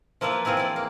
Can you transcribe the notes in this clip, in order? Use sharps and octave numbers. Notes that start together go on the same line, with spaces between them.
F3 A#3 E4 F4 B4
E3 F3 C4 E4 G#4
E4 D5
A#3